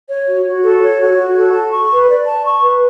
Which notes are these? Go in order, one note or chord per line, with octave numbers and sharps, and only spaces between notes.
C#5
F#4
F#4
A4
C#5
F#4
F#4
A4
A5
C#6
B4
D5
A5
C#6
B4